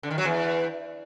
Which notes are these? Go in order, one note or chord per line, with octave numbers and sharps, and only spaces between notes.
D3
D#3
F#3
E2